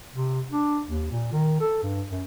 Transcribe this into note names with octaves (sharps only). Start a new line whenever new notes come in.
C3
D4
D#2
A#2
D#3
A4
G2
F#2